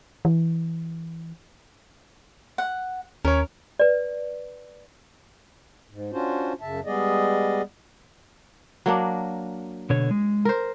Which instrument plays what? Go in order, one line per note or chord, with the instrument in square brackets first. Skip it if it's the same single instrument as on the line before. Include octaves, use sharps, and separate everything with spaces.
[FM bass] E3
[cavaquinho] F#5
[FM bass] D#2 [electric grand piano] C#4 C#5 [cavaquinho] A#4
[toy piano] B4 D5
[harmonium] G#2
C#4 D4 F4 F#4 C5
F#2 C#3 E5 A5
G3 G#3 B3 G#4 D5 D#5
[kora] F#3 A#3 D4
[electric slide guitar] B2 D3 C#5
G#3
[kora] A#4 C5